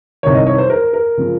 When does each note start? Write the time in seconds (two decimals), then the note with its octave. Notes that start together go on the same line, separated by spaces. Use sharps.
0.23 C2 C3 D#3 C#5
0.34 D#5
0.47 C#5
0.58 C5
0.70 A#4
0.93 A#4
1.17 C#3 F3